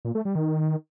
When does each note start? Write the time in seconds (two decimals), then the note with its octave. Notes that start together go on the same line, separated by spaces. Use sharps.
0.05 A#2
0.15 A3
0.25 G3
0.35 D#3
0.45 D#3